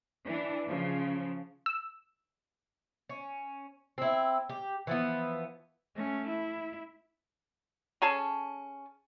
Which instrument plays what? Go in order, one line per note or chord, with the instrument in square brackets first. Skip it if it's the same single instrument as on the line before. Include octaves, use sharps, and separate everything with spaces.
[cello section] E3 D4
C#3 F3
[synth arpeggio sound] E6
[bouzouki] C#4
C4 E4
G4
E3 F3 B3
[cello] A3 C#4
E4
[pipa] C#4 G#4 A4 A5